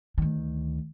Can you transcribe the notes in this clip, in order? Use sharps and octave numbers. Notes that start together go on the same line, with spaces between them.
D2 D#3